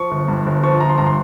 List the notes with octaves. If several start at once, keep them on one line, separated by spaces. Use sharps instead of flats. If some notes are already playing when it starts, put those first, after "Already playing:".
Already playing: F3 C#6
G1
G2
G1
F3 C#6
G1 A#5
C6
G2 A#5
C6